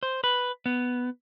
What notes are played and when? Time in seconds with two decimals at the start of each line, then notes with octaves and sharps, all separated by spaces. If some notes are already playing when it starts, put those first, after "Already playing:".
0.03 C5
0.24 B4
0.66 B3